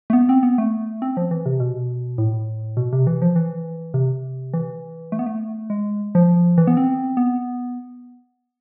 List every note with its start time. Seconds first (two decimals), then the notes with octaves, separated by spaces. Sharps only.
0.10 A3
0.13 B3
0.29 C4
0.43 B3
0.58 A3
1.02 C4
1.17 F3
1.31 E3
1.46 C3
1.60 B2
2.18 A2
2.77 B2
2.93 C3
3.07 E3
3.22 F3
3.36 E3
3.94 C3
4.54 E3
5.12 A3
5.19 B3
5.26 A3
5.70 G#3
6.15 F3
6.58 E3
6.67 B3
6.77 C4
7.17 B3